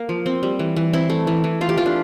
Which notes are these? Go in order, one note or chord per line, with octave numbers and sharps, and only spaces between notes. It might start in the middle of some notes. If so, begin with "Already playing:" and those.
Already playing: A#3 A#4
F3
C4
G3
E3
E3
C4 E4
A3
E3
E3
A3 F4
G4
E3 F4
D4